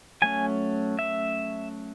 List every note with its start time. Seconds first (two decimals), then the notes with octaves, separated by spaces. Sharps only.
0.22 F#3 A3 C#4 G#5
0.99 E5